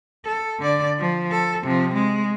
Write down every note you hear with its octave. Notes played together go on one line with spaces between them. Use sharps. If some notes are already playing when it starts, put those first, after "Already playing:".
A4
D3 D5
F3
A4
C3 F3
G#3